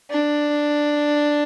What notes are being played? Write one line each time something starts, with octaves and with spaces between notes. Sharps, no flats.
D4